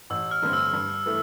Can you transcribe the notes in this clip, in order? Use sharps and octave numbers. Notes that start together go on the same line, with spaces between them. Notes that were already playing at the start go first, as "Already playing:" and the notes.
A1 E6
F6
G2 D3 A3 C4
E6
G2
E3 A3